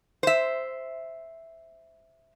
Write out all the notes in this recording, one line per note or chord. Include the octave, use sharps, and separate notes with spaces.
C5 E5